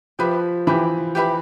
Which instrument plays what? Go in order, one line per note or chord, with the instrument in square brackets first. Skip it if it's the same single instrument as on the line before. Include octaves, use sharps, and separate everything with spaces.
[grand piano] F3 [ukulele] G4 B4 E5 B5
[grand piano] E3 [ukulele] G4 B4 E5 B5
[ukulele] G4 B4 E5 B5